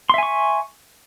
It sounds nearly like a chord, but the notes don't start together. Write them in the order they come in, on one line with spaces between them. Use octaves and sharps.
C6 E5 G#5 C#6